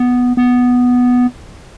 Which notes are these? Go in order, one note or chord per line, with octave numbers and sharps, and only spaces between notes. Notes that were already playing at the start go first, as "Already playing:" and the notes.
Already playing: B3
B3